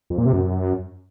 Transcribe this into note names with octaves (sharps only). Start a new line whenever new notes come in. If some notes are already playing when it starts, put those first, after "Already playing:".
F2
A#2
C3
F#2